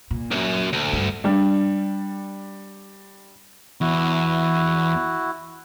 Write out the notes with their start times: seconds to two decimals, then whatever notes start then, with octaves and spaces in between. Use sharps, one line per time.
0.11 A#2
0.31 B1 F#2
0.73 D2
0.93 G2 D3
1.24 G3 D4
3.81 E2 E4 F#4